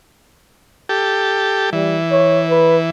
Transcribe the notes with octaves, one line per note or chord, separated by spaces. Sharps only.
G4 A4
E3 G3
C#5
B4